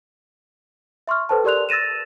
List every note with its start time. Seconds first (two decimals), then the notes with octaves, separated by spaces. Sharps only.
1.07 E5 C6 C#6 F6
1.29 A4 B4 C5 G5 A5
1.44 G4 A#4 D5 C6 F#6 F7
1.69 E6 A6 A#6 D#7 E7